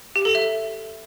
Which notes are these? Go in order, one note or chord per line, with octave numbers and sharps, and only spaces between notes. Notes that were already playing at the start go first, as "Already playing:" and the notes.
G4
A4
E5